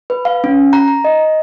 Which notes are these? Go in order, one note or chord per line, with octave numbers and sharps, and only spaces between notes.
B4
F5
C#4
A#5
A#5
D#5